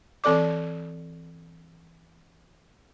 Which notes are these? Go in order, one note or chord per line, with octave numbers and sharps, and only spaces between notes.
E3 C4 A4 D5 D6